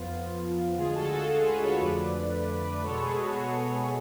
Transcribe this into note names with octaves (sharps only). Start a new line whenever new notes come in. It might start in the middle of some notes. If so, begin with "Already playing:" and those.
Already playing: F2 F3 B3 F4
D2 D3 G#3 F4 G#4
F#4 A4
F#4 A4
F4 G#4
G#4 B4
A4 C#5
F2 D3 F3 A3 B4 D5
B2 G#3 B3 A4 C#5
G#4 B4
F#4
F#4